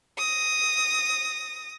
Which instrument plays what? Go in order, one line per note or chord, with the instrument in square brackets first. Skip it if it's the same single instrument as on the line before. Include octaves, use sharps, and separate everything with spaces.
[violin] D#6 A#6